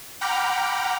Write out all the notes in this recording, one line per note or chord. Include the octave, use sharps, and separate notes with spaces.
F#5 G5 A#5 B5 D6 F6